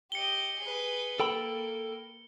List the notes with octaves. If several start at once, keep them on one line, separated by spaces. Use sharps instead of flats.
G4 D#5 C#7 G7
G#4 B4
A#3 A4 G5 B5